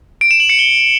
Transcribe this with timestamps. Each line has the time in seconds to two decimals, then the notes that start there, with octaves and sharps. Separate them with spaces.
0.21 D7
0.31 E7
0.40 F#7
0.49 C#7
0.59 G7